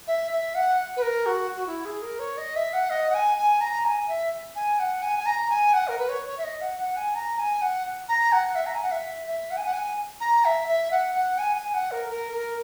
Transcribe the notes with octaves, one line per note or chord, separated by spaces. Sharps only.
E5
E5
F#5
B4
A#4
F#4
F#4
E4
G#4
A#4
C#5
D#5
E5
F#5
D#5
F#5
G#5
G#5
A#5
G#5
E5
G#5
F#5
G#5
G#5
A#5
G#5
F#5
A#4
B4
C#5
C#5
E5
D#5
F#5
F#5
G#5
A#5
G#5
F#5
A#5
F#5
E5
A#5
G#5
F#5
E5
E5
F#5
G#5
F#5
G#5
A#5
E5
E5
F#5
F#5
G#5
G#5
F#5
A#4
A#4
A#4